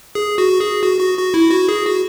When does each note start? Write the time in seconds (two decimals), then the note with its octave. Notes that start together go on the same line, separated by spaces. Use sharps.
0.15 G#4
0.38 F#4
0.60 G#4
0.83 F#4
1.00 F#4
1.18 F#4
1.34 E4
1.51 F#4
1.69 G#4
1.85 F#4